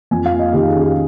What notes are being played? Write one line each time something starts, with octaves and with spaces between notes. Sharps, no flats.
F2 G#5
F5
A#3
D#5
D#3 G4
G#4
C#4
G4